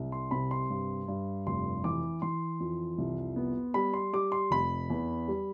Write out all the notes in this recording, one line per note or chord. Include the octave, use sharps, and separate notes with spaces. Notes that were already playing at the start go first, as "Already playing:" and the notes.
Already playing: C2
C6
C3 B5
C6
G2
G2
F1 C6
E3 D6
E3 C6
F2
C2
B3
G3 B5
C6
G3 D6
C6
F1 B5
E2
G3